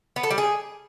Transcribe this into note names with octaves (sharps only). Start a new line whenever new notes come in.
B3
A4
G3
G#4